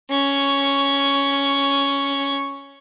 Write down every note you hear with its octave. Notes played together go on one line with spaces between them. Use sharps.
C#4 C#6